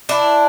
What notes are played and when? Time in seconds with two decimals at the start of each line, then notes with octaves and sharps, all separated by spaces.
0.09 D4 E4